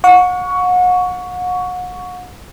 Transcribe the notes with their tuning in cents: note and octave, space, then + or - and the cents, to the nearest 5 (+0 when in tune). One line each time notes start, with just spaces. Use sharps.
F#5 -35 C#6 +15